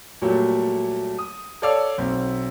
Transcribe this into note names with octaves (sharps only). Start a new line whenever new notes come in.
A#2 F#3 G3 A3
D#6
A4 C#5 D5 F5 E6
B1 C4